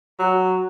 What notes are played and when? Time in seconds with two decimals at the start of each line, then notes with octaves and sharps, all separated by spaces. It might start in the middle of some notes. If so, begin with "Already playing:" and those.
0.19 F#3